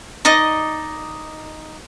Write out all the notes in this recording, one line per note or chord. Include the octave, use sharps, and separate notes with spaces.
D#4 D5 D#5 D#6